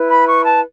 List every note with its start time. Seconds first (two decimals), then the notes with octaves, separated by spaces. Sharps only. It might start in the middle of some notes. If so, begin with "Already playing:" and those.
Already playing: E4 B4
0.09 B5
0.27 C#6
0.44 A5